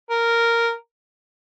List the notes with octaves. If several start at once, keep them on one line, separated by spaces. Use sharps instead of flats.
A#4